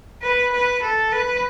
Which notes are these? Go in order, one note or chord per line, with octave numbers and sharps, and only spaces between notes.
B4
B4
A4
B4